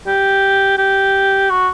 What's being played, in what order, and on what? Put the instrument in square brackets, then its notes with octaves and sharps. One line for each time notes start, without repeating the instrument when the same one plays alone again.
[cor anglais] G4
G4
F#4